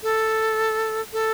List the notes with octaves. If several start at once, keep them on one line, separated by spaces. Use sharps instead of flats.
A4
A4